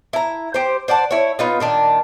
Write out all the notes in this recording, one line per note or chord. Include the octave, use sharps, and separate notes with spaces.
E4 A#5
G4 C5
C5 D5 F#5 A5
E4 C#5
B3 D#4 F4
A#2 D#3 D4